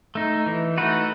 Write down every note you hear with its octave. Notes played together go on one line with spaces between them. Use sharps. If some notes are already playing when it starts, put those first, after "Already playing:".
A3 D#4
E3
A3 D#4 F#4 B4